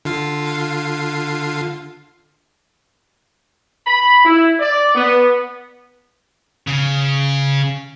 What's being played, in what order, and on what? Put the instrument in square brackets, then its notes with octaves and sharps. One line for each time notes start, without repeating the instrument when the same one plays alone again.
[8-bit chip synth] D3 F4 F5
[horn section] B5
E4
D5
B3
[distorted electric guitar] C#3